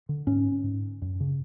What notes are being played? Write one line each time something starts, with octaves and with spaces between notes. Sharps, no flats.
D3
G#2 C#4
G#2
F#2
C#3